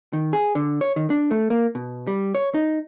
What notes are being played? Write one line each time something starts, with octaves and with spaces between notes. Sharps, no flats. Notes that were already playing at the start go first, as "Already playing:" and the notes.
D#3
G#4
D3
C#5
D#3
D4
A3
A#3
B2
G3
C#5
D#4